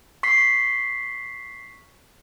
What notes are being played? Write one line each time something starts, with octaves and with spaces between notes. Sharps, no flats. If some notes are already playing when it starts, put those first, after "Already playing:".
C#6 B6 C7